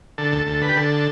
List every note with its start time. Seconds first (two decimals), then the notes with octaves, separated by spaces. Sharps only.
0.18 D3 A4
0.32 D2 A4
0.46 D2 A4
0.62 D3 B4
0.69 G4
0.76 D3 A4